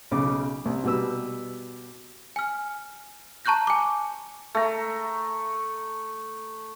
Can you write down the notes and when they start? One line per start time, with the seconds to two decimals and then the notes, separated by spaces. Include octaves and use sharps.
0.11 B1 C#3 D6
0.65 C2
0.84 B2 G3 G4 B4 E6
2.36 G#5 F6
3.45 A5 A#5 C#6 F#6 G6 A#6
3.67 G#5 D6
4.55 A3 A#5